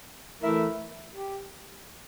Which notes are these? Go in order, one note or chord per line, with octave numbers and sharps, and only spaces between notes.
E3 A3 E4 A#4 E5
G4